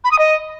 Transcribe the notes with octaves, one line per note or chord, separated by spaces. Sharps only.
B5
D#6
D#5